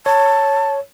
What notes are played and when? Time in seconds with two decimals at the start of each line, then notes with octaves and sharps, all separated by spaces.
0.06 C#5 A5